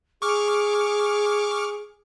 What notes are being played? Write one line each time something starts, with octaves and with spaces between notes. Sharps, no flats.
G#4 C#6 D6 F6